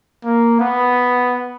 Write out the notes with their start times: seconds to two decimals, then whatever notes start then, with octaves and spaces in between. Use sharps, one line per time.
0.24 A#3
0.60 B3